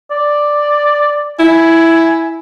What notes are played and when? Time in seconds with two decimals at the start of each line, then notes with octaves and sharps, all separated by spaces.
0.11 D5
1.39 E4 G#5